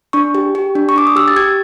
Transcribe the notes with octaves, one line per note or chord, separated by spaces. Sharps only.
D4 C#6
G4
G4
D4
C#6
D4 D6
D#6
G4 E6
A6
G4 G#6